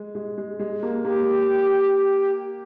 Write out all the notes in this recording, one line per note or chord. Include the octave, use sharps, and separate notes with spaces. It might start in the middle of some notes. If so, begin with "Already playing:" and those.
Already playing: G#3
G#3
G#3
G#3
A#3
A#3 G4